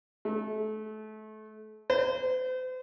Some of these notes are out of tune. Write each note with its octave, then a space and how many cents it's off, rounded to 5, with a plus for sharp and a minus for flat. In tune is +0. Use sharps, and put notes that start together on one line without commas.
A3 -30
C5 -40